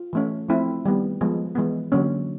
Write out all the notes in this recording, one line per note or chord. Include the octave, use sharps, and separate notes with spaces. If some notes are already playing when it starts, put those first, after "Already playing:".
Already playing: F4
E3 A3 C#4
F3 A3 C4 E4
D#3 G3 B3
F3 G#3 B3
E3 G#3 B3
D3 F#3 A#3 C#4